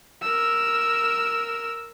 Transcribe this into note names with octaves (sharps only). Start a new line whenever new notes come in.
A#4 E6